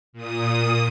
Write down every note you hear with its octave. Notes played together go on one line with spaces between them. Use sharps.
A#2 D#6